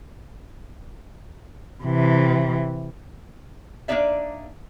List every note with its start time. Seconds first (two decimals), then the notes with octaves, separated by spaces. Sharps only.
1.84 C3 E3
3.88 A#3 B3 D4 D#4 D5 E5